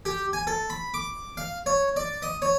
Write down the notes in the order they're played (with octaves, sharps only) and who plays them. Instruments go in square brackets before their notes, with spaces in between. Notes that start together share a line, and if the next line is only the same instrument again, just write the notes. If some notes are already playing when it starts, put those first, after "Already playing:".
[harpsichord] G4
G#5
A4
B5
D6
F5
C#5
D5
D#5
C#5